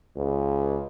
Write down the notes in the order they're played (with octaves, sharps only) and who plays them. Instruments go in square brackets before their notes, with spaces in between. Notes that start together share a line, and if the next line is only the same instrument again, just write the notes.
[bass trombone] C#2